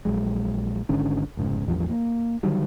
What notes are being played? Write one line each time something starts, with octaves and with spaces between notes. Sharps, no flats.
A#1 F#3 G#3
G#1 G#2 D3 C#4
F1 G#2 C#3
A1 E2 G2 F3
A#3
D3 D#3 F#3 G3